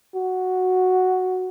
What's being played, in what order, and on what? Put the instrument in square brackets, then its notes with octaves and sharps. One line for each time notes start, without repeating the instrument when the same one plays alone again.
[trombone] F#4